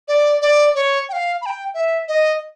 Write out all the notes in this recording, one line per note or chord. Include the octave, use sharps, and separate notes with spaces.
D5
D5
C#5
G5
F5
B5
G5
E5
D#5